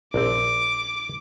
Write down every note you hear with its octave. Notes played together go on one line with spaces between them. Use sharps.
A#1 C4 D6